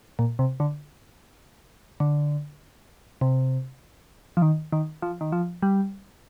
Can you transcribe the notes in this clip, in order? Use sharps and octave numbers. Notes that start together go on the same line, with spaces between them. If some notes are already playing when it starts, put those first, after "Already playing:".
A#2
C3
D3
D3
C3
F3
D#3
D#3
F3
D#3
F3
G3